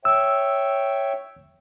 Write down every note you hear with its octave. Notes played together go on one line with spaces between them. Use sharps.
C#5 E5 G5 E6